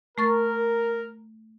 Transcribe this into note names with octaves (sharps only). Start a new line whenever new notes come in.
A3 A#4 C#6 A6